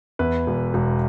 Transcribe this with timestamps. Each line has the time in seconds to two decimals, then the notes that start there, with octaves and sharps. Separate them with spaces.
0.19 E2 B4
0.47 E1
0.74 E1